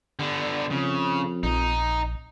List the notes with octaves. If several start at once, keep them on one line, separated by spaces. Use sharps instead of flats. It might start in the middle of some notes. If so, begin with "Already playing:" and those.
D3 B3
F2 C#3
A#1 D#4